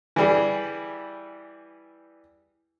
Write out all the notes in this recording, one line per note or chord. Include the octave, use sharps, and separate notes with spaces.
E3 G3 G#4